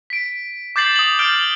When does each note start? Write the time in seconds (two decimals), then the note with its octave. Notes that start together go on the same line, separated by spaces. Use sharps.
0.10 B6 D7
0.76 D6 G6 A6 C7 F#7
0.96 D#6 F#7
1.19 F6 G6 D7 G7